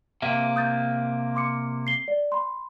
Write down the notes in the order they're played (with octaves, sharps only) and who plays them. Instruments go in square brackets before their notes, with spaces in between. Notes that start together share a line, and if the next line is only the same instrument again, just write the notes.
[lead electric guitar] C3 A#3 [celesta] E5
[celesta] D#6 G6 A6
C6 D6 C#7
C7 G7
D5
B5 C6